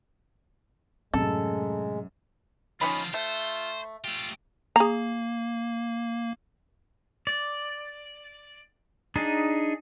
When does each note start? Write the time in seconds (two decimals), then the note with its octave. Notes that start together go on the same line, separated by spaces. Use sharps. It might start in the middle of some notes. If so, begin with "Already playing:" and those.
1.14 F#2 A2 C3 G#3 A4
2.81 D3 F3 C#4 D#4 F4 B5
3.14 A3 C5
4.04 A3 F4 G4
4.76 A#3 G#4 A#5
7.27 D5
9.16 D4 D#4 G#4